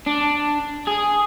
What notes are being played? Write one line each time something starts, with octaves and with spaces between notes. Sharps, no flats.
D4
G#4